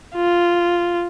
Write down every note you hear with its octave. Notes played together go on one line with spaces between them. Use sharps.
F4